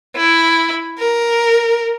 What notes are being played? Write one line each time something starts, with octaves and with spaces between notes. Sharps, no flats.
E4
A#4